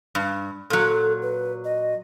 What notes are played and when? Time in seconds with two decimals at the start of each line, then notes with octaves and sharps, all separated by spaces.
0.15 G2
0.70 A#2 F#3 A4
1.22 B4
1.65 D#5